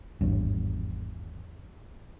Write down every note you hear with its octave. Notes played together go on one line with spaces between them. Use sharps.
G#1 E2 G2